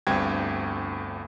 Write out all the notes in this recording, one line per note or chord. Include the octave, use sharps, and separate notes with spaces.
G1 D2 G2 C4 G5 G#6